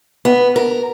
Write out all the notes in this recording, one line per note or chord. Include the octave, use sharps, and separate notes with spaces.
B3
A#4